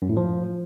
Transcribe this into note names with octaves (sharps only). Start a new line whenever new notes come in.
F#2
A2
F3